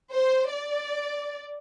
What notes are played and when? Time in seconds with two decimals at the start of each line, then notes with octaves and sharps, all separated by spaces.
0.11 C5
0.51 D5